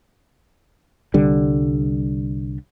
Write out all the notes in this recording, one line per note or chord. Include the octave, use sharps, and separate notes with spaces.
C2 D3 G3